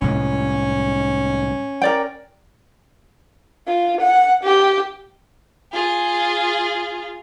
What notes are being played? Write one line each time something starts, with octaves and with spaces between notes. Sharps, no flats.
C2 A2 G#3 C#4
A#4 D5 G5
F4
F#5
G4
F4 G#4